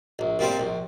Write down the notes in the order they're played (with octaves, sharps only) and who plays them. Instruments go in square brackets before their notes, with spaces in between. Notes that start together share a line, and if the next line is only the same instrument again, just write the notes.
[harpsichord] A#1
A#2 G3 C4
A#1